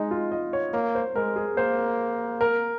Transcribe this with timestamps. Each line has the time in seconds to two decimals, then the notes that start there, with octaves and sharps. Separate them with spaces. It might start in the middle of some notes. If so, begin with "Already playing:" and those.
Already playing: G#3 D#4
0.11 F4
0.32 D#5
0.53 C#5
0.74 A#3 C#5
0.95 C5
1.15 G#3 A#4
1.36 G#4
1.57 A#3 C5
2.41 A#4